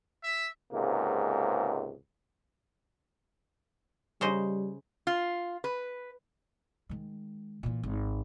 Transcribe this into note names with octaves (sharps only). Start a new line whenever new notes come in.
E5
C#2 G#2 C3 A#3
C#3 G3 C5 D#5
F4
B4
D#3 G#3
A#2 E3
G#1